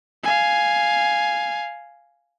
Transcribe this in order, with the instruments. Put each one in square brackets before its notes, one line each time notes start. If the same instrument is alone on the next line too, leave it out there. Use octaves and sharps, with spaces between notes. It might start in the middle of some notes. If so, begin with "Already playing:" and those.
[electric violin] F5 G#5